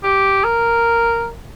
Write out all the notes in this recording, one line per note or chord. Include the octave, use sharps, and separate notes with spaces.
G4
A#4